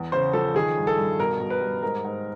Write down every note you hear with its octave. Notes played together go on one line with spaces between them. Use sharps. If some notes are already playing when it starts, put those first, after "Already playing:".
Already playing: E2
C#3 C5
F3 A4
D#3 G#4
G2
A4
G2
B2 A#4
B2
B4
G3
G#2 A#4
G#2